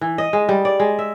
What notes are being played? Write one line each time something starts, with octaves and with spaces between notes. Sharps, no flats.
E3
D#5
G#3
G3
D5
G#3
E5